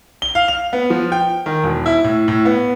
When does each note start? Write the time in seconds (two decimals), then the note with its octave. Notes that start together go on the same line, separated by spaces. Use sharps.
0.22 G7
0.35 F5
0.48 F7
0.73 B3
0.90 F3
1.12 G5
1.46 D#3
1.64 E1
1.86 E4
2.04 A2
2.28 A2
2.45 B3